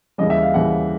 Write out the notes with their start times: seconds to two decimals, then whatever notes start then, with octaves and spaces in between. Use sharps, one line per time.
0.18 D#2 C#3 E3 G3 D#5
0.30 E5
0.42 F5
0.54 D#2 C#3 E3 G3 F#5